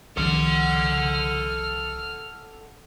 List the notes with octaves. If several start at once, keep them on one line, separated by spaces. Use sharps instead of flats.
C2 D#3 F3 A4 F#5 F6